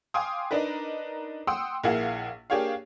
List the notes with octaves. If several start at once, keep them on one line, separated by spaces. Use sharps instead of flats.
F5 G5 G#5 C6 D6 D#6
D4 D#4 A#4 B4
F#5 G5 C6 D#6 E6
A#1 A#3 E4 G#4 F5 F#5
A#3 D4 G4 G#4 C#5 F5